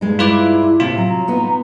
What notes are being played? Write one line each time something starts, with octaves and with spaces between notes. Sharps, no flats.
G2 G#3 D#4
E4 F4 B4 D6
A2 C3 F4
F#3 A#5
B3 D#4